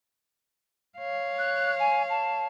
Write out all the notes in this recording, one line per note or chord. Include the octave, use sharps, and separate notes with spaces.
C#5 F5
F#6
G#5
A5